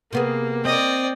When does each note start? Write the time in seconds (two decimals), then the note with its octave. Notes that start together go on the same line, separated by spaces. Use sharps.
0.13 C3 A#3 B3 G#4
0.65 C4 D5 D#5